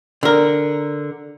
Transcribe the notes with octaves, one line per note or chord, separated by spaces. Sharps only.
D3 A#4